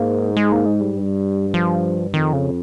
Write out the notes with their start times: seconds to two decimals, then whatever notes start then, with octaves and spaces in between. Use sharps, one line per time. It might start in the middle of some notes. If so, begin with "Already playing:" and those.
Already playing: G#2 A#3
0.37 G#3
0.52 A#3
0.66 G#3
0.81 G3
0.96 G2
1.54 F3
2.13 F2 D#3
2.33 C#3